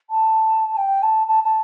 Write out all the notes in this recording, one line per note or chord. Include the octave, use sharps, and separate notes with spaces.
A5
G5
A5
A5
A5